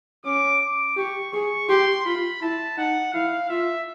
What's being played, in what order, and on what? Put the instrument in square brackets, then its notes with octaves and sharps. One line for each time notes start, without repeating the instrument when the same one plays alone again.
[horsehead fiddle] C#4 [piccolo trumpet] D6
[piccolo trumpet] D6
[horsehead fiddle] G4 [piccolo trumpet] C#6
[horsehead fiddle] G#4 [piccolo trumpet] C#6
[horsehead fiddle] G4 [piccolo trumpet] C6
[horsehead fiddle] F4 [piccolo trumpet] B5
[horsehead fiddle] E4 [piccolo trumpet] A5
[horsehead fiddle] D#4 [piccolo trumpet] F#5
[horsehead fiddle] E4 [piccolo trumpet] F5
[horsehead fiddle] F4 [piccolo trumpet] E5